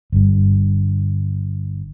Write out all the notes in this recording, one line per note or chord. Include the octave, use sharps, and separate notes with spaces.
G1 G2